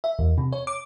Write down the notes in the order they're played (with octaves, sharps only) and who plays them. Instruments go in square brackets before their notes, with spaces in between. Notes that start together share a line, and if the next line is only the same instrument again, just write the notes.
[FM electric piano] E5
E2
C3
C#5
D6